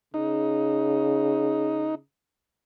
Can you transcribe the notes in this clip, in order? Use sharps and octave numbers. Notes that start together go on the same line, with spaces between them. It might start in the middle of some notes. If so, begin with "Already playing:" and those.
C#3 D#4